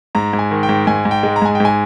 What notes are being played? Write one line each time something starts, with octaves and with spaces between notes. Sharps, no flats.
G#2 A#5
G#2
G#5
D#3
G5
G#2
G#2 G#5
G#2
G5
G#3
A#5
G#2 G#5
G5
G#2 G#5